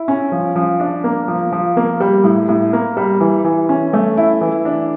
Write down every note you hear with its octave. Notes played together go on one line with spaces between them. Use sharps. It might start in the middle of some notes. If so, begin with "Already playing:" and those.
Already playing: E4
C#4
F3
F3
D4
A#3
F3
F3
A#3
G3
A2
A2
A#3
G3
E3
E3
C#4
A3
E4
E3
D4